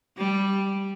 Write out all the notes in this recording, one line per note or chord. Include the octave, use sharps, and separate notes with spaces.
G3